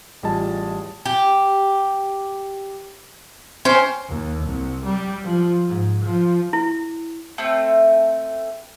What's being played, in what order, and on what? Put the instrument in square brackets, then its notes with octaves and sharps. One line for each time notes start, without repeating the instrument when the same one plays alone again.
[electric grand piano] A1 G3 F4 G#4 D#5 A5
[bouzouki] G4
C#4 C5 G5
[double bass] D#2
C2
G3
F3
G#2
F3
[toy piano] E4
[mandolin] A3 C4